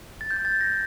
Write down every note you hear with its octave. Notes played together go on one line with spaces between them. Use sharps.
A6
G6
A6
A#6